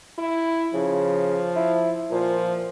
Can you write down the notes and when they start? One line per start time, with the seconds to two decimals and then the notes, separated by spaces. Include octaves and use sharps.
0.18 E4
0.74 C#3 F3
1.56 E4
2.11 A#2 F3